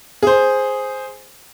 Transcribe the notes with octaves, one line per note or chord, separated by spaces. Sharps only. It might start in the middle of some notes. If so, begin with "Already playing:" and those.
G#4 C5